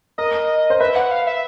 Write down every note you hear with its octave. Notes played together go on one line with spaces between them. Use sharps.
A#4 D#5
C5
B4 E5
F#5
F5
E5